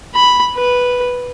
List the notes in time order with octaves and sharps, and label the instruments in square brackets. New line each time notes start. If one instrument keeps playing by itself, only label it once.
[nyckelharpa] B5
B4